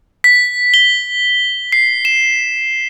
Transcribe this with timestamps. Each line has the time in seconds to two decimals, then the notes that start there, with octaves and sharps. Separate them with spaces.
0.24 B6
0.74 G7
1.72 C7
2.05 E7